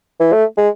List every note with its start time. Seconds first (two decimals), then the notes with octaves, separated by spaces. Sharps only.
0.20 E3
0.33 A3
0.57 G#3